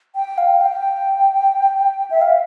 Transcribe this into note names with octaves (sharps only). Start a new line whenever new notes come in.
G5
F5
G5
E5
F5